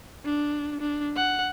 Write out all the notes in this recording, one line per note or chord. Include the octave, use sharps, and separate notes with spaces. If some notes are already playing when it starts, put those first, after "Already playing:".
D4
D4
F#5